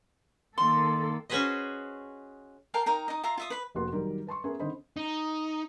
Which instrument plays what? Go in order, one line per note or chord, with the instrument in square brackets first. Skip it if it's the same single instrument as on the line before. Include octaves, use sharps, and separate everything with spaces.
[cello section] D#3 A#3 A4 [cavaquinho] C6
[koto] C#4 F#4 G#4 B4 C5 D#5
[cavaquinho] A4 A#4 F5 G5
D#4 A#4 G5
D#4 D#5
F4 E5 A#5 C6
F4 E5 D#6
B4 B5
[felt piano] F1 A#3 B3 F#4 C6
D#3 F#3 G3 A#4
B4 A5 C6 C#6
B3 C#4 G#4 A#4 E5
D3 D#3 C4 C5 D#5 B5
[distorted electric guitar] D#4